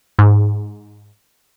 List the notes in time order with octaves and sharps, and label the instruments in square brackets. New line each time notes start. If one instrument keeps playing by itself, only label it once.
[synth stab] G#2